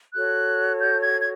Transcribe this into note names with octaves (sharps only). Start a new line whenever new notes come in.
F#4 A4 C#5 F#6
G6
G#6
G#6